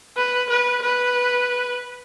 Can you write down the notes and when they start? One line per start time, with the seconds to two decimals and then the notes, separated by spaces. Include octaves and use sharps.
0.16 B4
0.50 B4
0.83 B4